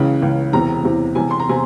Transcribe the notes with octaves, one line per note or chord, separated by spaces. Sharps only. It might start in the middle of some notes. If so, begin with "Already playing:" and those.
Already playing: C#2 C#3 E3
C#2 C#3 E3
E1 E2 C3 E3 A#5
E1 E2 C3 E3
E1 E2 C3 G#5
C6
A#5
C3 G#5